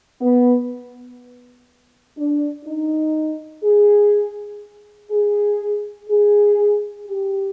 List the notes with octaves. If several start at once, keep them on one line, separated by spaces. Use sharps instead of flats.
B3
D4
D#4
G#4
G#4
G#4
G4